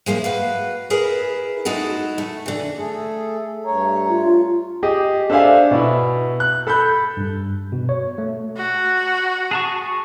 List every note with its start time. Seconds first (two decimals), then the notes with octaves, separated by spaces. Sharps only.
0.06 F3 G#3 A#3 E4
0.24 F#4 B4 F5
0.90 E4 G#4 A#4 B4
1.65 G#3 D#4 E4 F#4 A4
2.18 A3
2.46 D3 E3
2.75 A3 G#4 A4
3.65 G2 A3 C#5 A#5
4.09 F4
4.83 G4 G#4 D#5
5.30 D4 A4 C5 E5 F5 G#5
5.71 B2 E4
6.40 F#6
6.67 A4 B5 F#6 G6
7.17 G2
7.72 B2
7.89 C#5
8.18 A3
8.57 F#4
9.51 G#4 A5 C#6